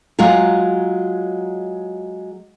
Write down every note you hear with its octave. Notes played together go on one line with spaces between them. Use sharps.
F#3 G#3 F4 G#4